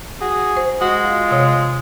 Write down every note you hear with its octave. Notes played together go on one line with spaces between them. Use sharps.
F#4 G#4
C5
G#3 F#4 D#6
F4
C3 C#5